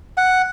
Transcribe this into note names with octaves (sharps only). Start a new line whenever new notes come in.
F#5